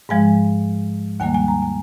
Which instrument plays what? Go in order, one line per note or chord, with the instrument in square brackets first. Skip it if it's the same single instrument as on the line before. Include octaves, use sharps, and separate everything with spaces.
[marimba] G#2 F3 G#3 G#5
D#2 D#3 G3 A#3 G#5
G#5
A#5
G#5